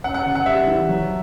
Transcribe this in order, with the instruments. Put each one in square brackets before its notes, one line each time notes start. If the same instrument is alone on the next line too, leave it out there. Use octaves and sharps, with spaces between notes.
[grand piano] C#4 [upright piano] F#5
[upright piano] F#5
[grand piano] C#3
[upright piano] F#5
[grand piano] G3 [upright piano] E5
[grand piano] E3
F#3